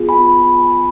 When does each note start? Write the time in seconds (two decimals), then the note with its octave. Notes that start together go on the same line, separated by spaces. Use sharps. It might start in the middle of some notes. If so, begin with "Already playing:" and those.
Already playing: B3 F4 G#4
0.09 G#5 B5